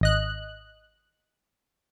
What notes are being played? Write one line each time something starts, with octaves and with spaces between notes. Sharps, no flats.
G#1 D#5 F#6